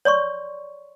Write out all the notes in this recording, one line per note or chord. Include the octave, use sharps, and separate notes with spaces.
C#5 D5 C6 C#6